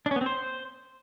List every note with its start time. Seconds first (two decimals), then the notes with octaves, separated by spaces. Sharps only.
0.06 D4
0.11 C#4
0.16 B3
0.21 C4
0.26 C5